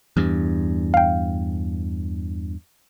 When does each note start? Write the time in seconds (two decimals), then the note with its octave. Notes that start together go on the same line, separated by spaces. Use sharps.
0.17 E2 G2
0.94 F5 G5